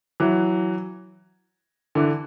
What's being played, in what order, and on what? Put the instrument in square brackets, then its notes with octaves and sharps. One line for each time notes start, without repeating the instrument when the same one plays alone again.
[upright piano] E3 F#3
D3 E3